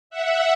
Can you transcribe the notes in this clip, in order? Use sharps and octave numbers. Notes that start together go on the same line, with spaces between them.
E5 F#5